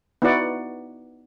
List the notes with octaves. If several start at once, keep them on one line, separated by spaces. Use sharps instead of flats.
B3 D#4 E4 F#4 D5 F#5